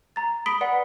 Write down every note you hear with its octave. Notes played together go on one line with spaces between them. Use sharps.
A#5 A6
B5 D#6 B6 D7 G7
B4 D5 F#5